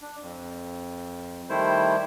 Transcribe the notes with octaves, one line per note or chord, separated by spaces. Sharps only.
D4
F2
D#3 G3 A3 E4 C5